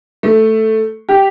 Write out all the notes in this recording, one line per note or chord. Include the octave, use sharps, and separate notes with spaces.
A3
G4